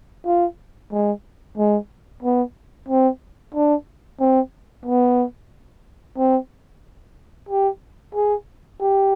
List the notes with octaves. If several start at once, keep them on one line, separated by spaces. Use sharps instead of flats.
F4
G#3
G#3
B3
C4
D4
C4
B3
C4
G4
G#4
G4